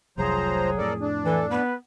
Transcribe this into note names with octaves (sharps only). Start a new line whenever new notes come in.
F1 C2 F3 F#3 G#4 C5 A#5
F2 A2 A4 A#4 D5
D4
E3 A4
B3 B4